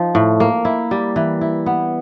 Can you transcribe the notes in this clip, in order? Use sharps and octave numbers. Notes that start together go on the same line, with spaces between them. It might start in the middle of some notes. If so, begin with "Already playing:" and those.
Already playing: F3 D#4
A2
A#3
E4
G3
E3
E4
B3